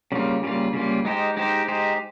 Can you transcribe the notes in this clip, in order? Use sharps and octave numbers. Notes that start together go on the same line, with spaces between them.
C#3 G3 A#3 F4
C#3 G3 A#3 F4
C#3 G3 A#3 F4
G#3 D#4 G4 C5
G#3 D#4 G4 C5
G#3 D#4 G4 C5